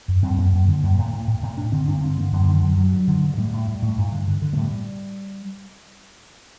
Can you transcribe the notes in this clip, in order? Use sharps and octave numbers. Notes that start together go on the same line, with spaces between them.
F#2
F#2 C4
F#2 A#3
F#2
D3
F#2
A2
A2
A2
A2
G2 D4
D3 C4
G2 D4
A#3
D3 C4
D3 A#3
F#2 D3
D3 D#3
F#2 F#3
G2 F#3
G2
D3
G2
A2 G3
A2
A2
A2
G2
D3
D3
D3
A3
A2 G3